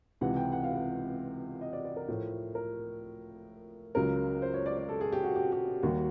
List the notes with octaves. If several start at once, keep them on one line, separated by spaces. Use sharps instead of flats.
C#2 C3 E3 F#5
G5
F#5
F5
F#5
D#5
D5
D5
A#4
A2 F3 A3
A#4
C#2 C#3 F#3 A#4
C5
C#5
D5
D5
A4
G#4
G4
F#4
G4
G4
D#2 D#3 G3 F#4